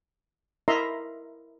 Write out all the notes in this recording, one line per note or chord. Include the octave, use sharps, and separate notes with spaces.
E4 A#4 D#5 E5 A#5 C6